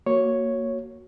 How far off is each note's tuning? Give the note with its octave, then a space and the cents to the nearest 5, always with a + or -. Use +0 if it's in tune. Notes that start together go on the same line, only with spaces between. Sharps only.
A#3 +0 F#4 +0 C#5 +0